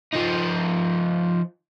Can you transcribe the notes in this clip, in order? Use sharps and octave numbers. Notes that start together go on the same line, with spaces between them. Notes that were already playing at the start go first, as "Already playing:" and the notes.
F3 D#4